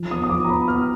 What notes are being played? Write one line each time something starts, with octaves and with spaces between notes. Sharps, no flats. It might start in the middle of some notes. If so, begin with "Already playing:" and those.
Already playing: F3
B3 D#6
D#6
F3 D6
A#5
B3 B5
B3 F6